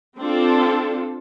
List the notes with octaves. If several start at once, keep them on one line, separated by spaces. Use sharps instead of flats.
C4 D4 F4 A4